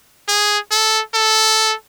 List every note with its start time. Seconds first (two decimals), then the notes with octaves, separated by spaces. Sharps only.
0.29 G#4
0.71 A4
1.14 A4